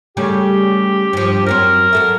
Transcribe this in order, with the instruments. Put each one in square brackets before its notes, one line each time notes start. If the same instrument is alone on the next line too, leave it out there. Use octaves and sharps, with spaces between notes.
[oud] C#3 G3 A3 [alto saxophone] G4
[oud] G2 F3
[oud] F#2 F#3 C4 [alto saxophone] A#4
[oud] F#3 A4 E5